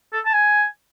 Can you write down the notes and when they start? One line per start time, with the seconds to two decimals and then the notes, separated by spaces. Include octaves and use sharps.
0.13 A4
0.25 A5
0.33 G#5